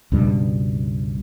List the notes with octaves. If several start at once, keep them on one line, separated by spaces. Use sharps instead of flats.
C#2 G2 B2 G3